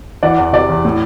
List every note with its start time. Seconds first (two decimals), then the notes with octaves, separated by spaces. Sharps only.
0.23 E3 D5 F#5
0.38 E2
0.53 C3 D5
0.69 E2
0.85 A2